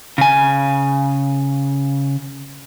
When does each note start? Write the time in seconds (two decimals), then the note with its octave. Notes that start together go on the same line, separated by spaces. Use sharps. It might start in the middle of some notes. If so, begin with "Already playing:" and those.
0.18 C#3 G#5